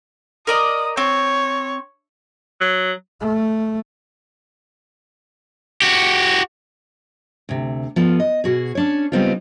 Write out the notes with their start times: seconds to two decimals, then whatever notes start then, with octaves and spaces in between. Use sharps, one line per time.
0.47 A#4 D5 D#5 D#6
0.97 C4 C#5
2.61 F#3
3.21 A3
5.82 F#4 G4
7.49 D2 C3
7.96 F3 B3 F4 A4
8.20 D#5
8.44 B2 F#4 G#4
8.75 C#4 D4 C#5
9.12 C#3 G3 B3 C4 D#4 F4